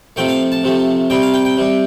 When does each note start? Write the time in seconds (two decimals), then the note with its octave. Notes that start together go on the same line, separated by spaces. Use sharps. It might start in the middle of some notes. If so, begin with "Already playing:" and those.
0.16 C3 F3 A3 G5
0.28 F5
0.52 A5
0.63 C3 F3 A3
1.10 C3 G3 G5
1.22 F5
1.34 G5
1.45 G5
1.57 C3 G3